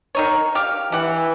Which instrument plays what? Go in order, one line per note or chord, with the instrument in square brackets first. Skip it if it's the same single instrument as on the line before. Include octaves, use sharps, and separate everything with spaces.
[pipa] D#3 D#4 C#5
G4 F5
[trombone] E3 [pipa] G4 F#5